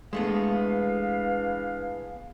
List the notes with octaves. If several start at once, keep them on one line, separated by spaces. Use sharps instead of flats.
E3 G#3 A3 B3 D4 F5